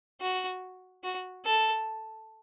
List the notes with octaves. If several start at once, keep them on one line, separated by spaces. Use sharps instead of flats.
F#4
F#4
A4